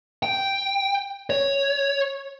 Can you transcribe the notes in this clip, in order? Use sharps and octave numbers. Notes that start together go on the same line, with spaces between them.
G5
C#5